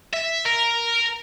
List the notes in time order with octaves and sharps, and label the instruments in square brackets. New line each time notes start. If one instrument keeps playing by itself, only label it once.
[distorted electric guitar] E5
A#4